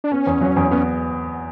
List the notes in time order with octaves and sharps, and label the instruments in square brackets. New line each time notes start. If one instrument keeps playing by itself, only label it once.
[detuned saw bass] D4
[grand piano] B3 [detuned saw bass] C#4
[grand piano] E2
F#3
E2
[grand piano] B3 [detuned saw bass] C#4